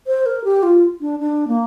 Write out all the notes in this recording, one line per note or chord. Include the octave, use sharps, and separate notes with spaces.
C5
A#4
G4
F4
D4
D4
A#3